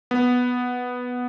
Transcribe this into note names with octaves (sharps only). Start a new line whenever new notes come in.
B3